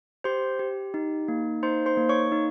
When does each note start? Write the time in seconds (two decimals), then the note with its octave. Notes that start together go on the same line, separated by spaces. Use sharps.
0.24 G4 C5 C6
0.59 G4
0.94 D#4
1.28 A#3
1.63 D#4 C5 C6
1.86 C5 C6
1.97 A#3
2.09 C#5 C#6
2.32 D#4